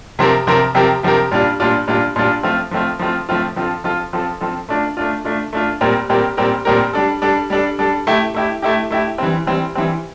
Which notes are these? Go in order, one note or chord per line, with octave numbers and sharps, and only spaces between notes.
C3 F3 C4 G4 A#4
C3 F3 C4 G4 A#4
C3 F3 C4 G4 A#4
C3 F3 C4 G4 A#4
A#2 G3 D4 F4
A#2 G3 D4 F4
A#2 G3 D4 F4
A#2 G3 D4 F4
F3 A3 C4 F4
F3 A3 C4 F4
F3 A3 C4 F4
F3 A3 C4 F4
F3 C4 F4 A4
F3 C4 F4 A4
F3 C4 F4 A4
F3 C4 F4 A4
A3 D4 F4
A3 D4 F4
A3 D4 F4
A3 D4 F4
A#2 G3 C4 G4 A#4
A#2 G3 C4 G4 A#4
A#2 G3 C4 G4 A#4
A#2 G3 C4 G4 A#4
G3 D4 A4
G3 D4 A4
G3 D4 A4
G3 D4 A4
A3 E4 G4
A3 E4 G4
A3 E4 G4
A3 E4 G4
E3 G3 C4
E3 G3 C4
E3 G3 C4